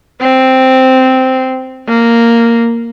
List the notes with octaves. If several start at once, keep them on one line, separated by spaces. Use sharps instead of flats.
C4
A#3